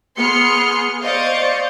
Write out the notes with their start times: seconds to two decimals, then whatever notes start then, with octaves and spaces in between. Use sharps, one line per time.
0.18 B3 G#4 C6 F6 C#7
1.03 C5 D5 D#5 F5 C#6